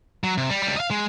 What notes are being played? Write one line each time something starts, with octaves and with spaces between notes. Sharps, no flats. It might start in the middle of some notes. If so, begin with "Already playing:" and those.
F#3
C3
G3
C#2 G3
D#5 F5
G#3